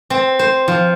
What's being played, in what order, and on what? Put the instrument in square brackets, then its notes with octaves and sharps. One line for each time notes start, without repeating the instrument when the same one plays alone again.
[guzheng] C4
C5
F3